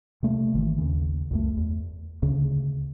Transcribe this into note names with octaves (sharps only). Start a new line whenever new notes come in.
C3 A3 A#3
G#1 D#3 E3
D#2 C#3
C#2 F#2 A3
E2
D2 C#3